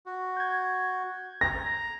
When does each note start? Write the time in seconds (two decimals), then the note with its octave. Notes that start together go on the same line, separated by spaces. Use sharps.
0.06 F#4
0.37 G6 G#6
1.41 A#5 A#6